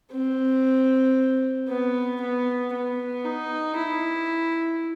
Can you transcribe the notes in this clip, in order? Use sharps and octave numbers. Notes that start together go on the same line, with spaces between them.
C4
B3
B3
B3
D#4
E4